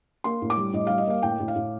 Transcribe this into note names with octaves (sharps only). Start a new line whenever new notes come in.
A#3 C6
A2
D6
G3
A2 D#5
G3 F5
D#5
A#3 F5
A2 G5
A2
F5
A2